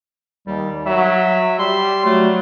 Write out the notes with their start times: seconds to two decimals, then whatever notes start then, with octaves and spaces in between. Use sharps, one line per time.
0.47 D#2 G3
0.86 F#3 E5
1.59 G3 C6
2.05 F#3 A3